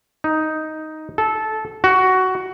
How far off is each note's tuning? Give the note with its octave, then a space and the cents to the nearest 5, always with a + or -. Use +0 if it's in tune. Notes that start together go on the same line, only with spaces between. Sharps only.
D#4 +5
A4 -15
F#4 +10